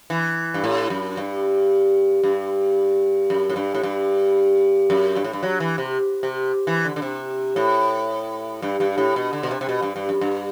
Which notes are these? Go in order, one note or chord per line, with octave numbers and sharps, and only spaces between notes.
E3
G2
A2
F#2
G2
G2
F#2
A2
G2
A2
G2
F#2
G2
A2
G2
F#3
E3
C3
C3
E3
D3
D3
C3
A2
G2
G2
A2
B2
D3
B2
C3
C3
B2
G2
G2
F#2
G2